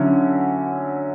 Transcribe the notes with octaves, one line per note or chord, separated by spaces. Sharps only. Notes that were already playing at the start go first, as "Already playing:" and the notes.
Already playing: D3 F#3 C#4 E4